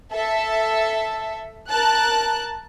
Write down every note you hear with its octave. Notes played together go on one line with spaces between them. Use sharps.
A4 E5
A#4 A5 F#6